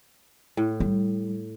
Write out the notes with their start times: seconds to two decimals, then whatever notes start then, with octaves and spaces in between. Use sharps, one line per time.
0.57 A2
0.80 G3